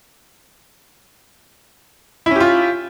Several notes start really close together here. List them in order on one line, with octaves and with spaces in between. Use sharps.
E4 C#4 G4 F4